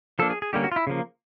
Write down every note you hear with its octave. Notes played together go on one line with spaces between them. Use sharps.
F3 A#3 D4 A4
G#4
G#4
D3 G3 A#3 C#4 G4
F#4
F4
E4
C#3 F3 A#3